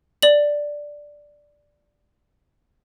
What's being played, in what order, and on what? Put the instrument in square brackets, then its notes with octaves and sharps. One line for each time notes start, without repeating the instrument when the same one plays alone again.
[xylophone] D5 F#7